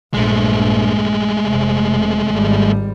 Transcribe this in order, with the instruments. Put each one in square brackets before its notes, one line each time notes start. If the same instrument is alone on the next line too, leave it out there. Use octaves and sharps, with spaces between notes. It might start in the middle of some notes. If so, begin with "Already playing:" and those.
[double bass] A#1 G2 [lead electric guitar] G#3 A3
[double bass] F1 C3
G#1 G3